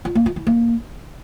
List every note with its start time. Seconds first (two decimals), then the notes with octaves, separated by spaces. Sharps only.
0.05 F4
0.15 A#3
0.26 F4
0.36 E4
0.47 A#3